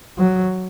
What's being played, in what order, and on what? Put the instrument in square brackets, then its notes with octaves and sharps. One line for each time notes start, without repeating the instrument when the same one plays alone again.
[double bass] F#3